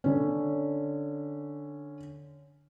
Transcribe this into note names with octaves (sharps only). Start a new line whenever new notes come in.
D3 C#4